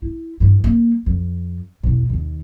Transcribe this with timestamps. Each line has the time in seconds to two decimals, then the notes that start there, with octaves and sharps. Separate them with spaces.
0.02 E4
0.40 G2 E3
0.64 G3 A#3
1.06 F2
1.83 E2 B2
2.10 D#2 D#3